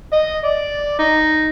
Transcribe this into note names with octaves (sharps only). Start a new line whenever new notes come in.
D#5
D5
D#4